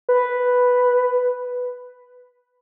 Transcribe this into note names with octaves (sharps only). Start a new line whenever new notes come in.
B4